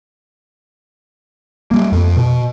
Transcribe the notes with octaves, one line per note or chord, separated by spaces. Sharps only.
G3 A#3
F2
B2